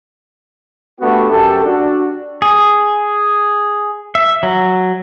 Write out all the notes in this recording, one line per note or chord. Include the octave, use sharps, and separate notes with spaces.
A3 B3 D4 F#4 G4
F#2 G4 A4
D4 F#4
G#4
E5
F#3